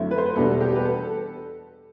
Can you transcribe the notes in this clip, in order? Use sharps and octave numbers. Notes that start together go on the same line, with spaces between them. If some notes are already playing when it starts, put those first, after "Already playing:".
Already playing: F#2 D3 A3 C4 E4
B4
C5
B4
E2 B2 G3 D4 A4
G4
B4
A4